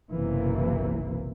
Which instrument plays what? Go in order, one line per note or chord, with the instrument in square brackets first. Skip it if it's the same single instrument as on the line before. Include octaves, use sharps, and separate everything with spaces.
[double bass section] F#1 B1 C3 E3 A#3